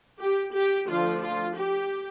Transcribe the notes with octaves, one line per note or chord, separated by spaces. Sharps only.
G4
G4
D3 F3 A3 D4 F4
F4
G4